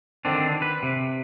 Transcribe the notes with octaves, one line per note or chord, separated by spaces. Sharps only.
D3 D#3 C4 D4
B4
C3